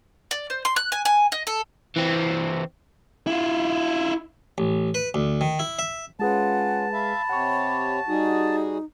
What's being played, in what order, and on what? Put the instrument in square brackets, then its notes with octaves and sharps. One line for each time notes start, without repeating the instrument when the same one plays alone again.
[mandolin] D5
C5
C6
F#6
G#5
G#5
D#5
A4
[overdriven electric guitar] E3 C4
[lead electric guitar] E4 F4
[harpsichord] A1
B4
D2
D#3
E4
E5
[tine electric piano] G#3 G#4 B4 [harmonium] C#4 F4 [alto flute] F#5 [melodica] A5
[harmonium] E5 F5 [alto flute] B5
[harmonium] C3 G4 C#5 [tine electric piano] F#5 C#6
[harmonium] G3 F#4 G#4 [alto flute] D#4